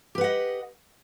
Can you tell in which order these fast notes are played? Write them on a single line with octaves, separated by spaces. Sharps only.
G4 B4 F#5 D#5